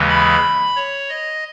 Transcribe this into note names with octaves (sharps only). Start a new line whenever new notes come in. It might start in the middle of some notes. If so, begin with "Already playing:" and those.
Already playing: D#2 C#3 E3 G#3
B5
C#5
D#5